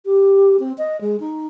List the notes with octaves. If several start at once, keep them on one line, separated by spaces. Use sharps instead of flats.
G4
C4
D#5
G#3
D#4